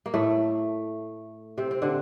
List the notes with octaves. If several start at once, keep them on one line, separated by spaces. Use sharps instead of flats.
A#3
A2 A3
C3 C4
C4
D3 D4